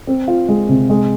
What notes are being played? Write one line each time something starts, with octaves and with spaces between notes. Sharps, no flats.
C4
F4
G#3
C3
G#3